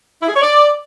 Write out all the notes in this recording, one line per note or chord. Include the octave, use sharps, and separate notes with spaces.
E4
G#4
C#5
D5